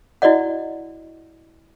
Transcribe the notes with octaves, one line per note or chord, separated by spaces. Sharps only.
E4 F#4 D5 D#5 F#5